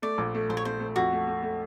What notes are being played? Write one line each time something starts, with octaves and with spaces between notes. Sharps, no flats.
A3 D5
A#1
A3
A#1 C5
C#5
A3 C5
A3
F2 F#4
A3
A3
A3